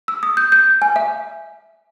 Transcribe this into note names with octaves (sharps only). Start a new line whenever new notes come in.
E6
D#6
G6
G6
G#5
E5